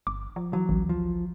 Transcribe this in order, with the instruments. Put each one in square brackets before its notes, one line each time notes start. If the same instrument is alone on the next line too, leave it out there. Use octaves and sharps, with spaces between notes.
[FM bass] G1 [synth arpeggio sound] D6
[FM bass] F3
[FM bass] E3 [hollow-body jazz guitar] F#3
[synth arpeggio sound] A1 [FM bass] D2
[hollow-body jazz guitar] F3